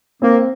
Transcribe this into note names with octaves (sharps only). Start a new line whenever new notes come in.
A#3 C4